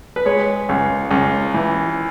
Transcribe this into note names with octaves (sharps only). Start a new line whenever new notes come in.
B4
G#3 C#5
C#2
C#2
E3